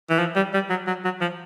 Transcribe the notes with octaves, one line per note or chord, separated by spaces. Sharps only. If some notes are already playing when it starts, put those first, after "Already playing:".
E3
F3
G3
G3
F#3
F#3
F#3
F3